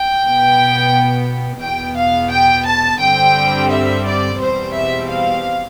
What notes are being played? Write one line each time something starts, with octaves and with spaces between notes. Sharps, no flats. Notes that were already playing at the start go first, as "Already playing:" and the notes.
Already playing: G5
B2 B3
E2 B2 B3 G5
F5
G5
A5
G2 D3 G3 C4 G5
E5
D5
E2 B2 G3 C4 C5
E5
F5